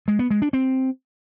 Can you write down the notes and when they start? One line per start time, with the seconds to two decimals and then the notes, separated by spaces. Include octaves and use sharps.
0.08 G#3
0.19 B3
0.31 G#3
0.42 D4
0.53 C4